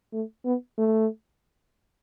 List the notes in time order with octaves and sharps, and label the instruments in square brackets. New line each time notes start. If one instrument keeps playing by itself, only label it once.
[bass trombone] A3
B3
A3